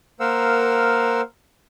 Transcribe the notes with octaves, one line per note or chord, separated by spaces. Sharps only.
A#3 A#4 C5 F5 F#5 E6